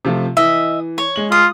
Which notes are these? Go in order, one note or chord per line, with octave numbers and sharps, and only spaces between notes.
C3 F3 A3
E3 D#5 E5
C#5
G#3 F#7
F4 D#6